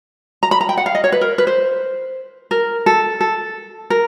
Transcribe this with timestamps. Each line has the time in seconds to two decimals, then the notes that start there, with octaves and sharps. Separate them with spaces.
0.43 A#5
0.51 B5
0.61 A#5
0.69 G5
0.77 F#5
0.86 F5
0.95 D#5
1.04 C#5
1.12 B4
1.21 A#4
1.38 B4
1.47 C5
2.51 A#4
2.86 A4
3.20 A4
3.90 A#4